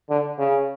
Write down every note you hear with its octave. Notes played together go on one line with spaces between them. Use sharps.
D3
C#3